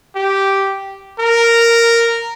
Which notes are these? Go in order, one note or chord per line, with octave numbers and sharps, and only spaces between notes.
G4
A#4